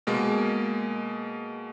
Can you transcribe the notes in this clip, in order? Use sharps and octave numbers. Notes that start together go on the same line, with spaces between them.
B2 G#3 A#3